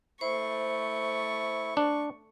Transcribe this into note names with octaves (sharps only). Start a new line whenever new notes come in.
A3 E4 C5 C#6
D4